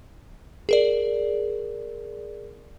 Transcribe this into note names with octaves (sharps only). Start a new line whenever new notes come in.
G#4 A#4 D5